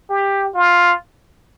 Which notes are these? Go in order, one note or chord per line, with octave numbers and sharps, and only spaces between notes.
G4
F4